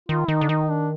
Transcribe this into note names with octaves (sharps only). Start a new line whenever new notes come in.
D#3 F4
D#3 D#4
D3
D#3 D#4
D4